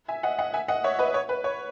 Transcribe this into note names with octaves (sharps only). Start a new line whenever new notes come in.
E5 G#5
D#5 F#5
D#5 F#5
E5 G#5
D#5 F#5
C#5 E5
B4 D#5
C#5
B4
C#5